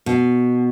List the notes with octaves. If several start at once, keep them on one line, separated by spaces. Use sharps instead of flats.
B2